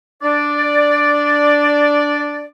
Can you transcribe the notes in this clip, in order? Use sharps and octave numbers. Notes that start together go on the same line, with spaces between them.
D4 D5